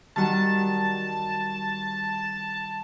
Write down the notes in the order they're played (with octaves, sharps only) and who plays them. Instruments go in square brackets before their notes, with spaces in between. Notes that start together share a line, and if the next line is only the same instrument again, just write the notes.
[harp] D#3 G3 F#4 [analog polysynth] A5